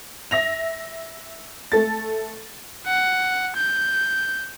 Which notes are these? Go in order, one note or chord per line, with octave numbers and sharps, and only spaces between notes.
E5 A#6 F7
A3 A4 A6
F#5
G6